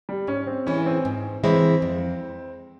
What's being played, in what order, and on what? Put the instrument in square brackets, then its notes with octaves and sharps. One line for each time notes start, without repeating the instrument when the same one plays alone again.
[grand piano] G3
[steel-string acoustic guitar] G#2 [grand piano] C#4
[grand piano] C4
[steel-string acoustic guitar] E3 G#3 E4 [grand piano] C#4
[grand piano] C4
[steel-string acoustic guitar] G#2
[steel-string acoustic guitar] E3 G#3 E4 [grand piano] C4
[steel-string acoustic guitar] F2